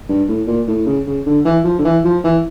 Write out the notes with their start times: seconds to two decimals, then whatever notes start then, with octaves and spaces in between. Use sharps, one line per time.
0.09 G2
0.28 A2
0.47 A#2
0.68 A2
0.86 C#3
1.07 C#3
1.26 D3
1.45 E3
1.65 F3
1.79 D3
1.85 E3
2.04 F3
2.24 E3